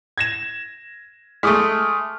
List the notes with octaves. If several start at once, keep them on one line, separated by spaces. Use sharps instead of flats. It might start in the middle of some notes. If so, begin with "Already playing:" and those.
G#6 A#6 E7
G#3 A3 D6 D#6 F6